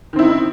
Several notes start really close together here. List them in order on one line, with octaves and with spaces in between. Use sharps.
D#3 C4 E4 D#4